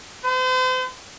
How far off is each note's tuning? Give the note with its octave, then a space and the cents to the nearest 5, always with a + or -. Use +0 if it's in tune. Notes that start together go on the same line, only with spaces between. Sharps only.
C5 -40